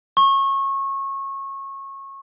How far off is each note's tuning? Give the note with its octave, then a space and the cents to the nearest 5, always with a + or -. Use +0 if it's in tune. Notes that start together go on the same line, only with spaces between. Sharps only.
C#6 -25